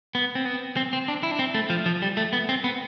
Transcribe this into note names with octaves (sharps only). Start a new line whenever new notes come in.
B3
C4
B3
C4
C4
D4
E4
D4
C4
A3
F3
F3
G3
A3
B3
C4
B3